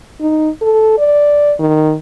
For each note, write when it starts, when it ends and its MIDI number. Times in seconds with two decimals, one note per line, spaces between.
0.21 0.49 63
0.61 0.98 69
0.98 1.54 74
1.59 1.94 51